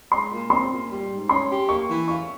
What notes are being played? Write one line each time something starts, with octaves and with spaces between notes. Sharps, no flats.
G#3 C6
A#2
C4 C6
A#2
G3
G#2
C#4 C6
G4
A#3 C#6
E3
F4 C#6